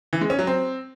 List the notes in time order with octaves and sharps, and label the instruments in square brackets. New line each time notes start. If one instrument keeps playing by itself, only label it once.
[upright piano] E3
G#3
C#4
F#3
C4